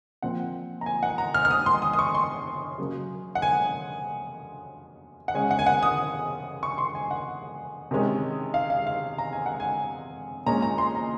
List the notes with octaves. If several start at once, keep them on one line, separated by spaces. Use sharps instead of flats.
A#2 F3 C4 F#5
A#5
G#5
F#5
A#5
F6
F6
D#6
C6
D#6
D#6
C#6
C6
C#3 F#3 A#3 C#4
F#5
G#5
F#5
C#3 G#3 C#4 G#5
F#5
G#5
F#5
D#6
C#6
C6
G#5
F#5
C3 D#3 G#3 C#4
F5
F5
F5
A#5
G#5
F#5
G#5
A#2 G#3 C#4 A#5
A#5
C6
A#5